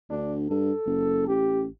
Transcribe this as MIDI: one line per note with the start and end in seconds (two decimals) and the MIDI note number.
0.10 0.45 38
0.10 0.35 62
0.50 0.72 43
0.50 1.25 69
0.86 1.24 30
1.28 1.67 33
1.28 1.65 67